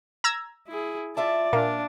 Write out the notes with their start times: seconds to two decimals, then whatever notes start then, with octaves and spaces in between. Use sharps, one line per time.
0.24 A#5 E6 G#6
0.68 E4 G#4
1.17 F4 D5 E5 A5
1.53 A#2 D4 F5